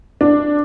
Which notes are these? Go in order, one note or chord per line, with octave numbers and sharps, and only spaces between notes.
D4